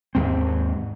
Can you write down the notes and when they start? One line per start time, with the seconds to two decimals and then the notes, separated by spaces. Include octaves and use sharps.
0.15 D#2 G#2 C4